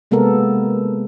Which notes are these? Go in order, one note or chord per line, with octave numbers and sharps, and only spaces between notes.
C3 G#3 A#3 B3 A4 A#4